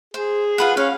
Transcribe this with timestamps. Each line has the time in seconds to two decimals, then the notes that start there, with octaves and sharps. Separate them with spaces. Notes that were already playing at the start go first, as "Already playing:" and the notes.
0.14 G#4 C5
0.58 F4 B4 F#5
0.77 C#4 F5